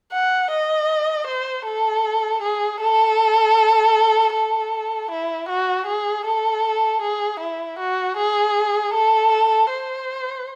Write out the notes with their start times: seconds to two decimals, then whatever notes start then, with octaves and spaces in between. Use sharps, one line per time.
0.13 F#5
0.51 D#5
1.27 C5
1.65 A4
2.42 G#4
2.80 A4
4.34 A4
5.11 E4
5.49 F#4
5.86 G#4
6.25 A4
7.01 G#4
7.40 E4
7.79 F#4
8.17 G#4
8.94 A4
9.70 C5